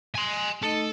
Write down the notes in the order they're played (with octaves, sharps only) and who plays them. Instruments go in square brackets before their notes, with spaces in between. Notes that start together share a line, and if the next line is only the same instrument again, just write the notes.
[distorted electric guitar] G#5 C6
[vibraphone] A3 D#4 D#5 [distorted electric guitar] A4